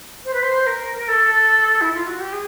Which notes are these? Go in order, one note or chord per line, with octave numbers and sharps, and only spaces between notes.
C5
B4
C5
A#4
A#4
A4
E4
F4
F#4
G4
G#4